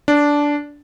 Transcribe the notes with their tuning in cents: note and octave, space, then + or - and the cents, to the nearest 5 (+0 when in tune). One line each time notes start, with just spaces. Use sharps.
D4 -10